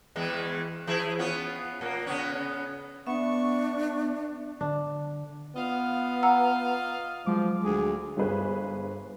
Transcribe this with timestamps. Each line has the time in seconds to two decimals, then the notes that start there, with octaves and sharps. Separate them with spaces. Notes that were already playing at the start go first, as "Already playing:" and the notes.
0.16 E2 E3 G#3
0.87 E3 E4 G#4
1.19 B3 C#4 F4
1.81 A#2 A#3
2.06 C#3 B3 C#4
3.07 B3 D4 E5 C#6
4.61 D3 D4
5.56 B3 F4 D#5 F5
6.23 F#5 A#5 E6
7.26 F3 F#3 G#3 D6
7.63 D2 G#4
8.17 G1 G2 G#4 B4 C5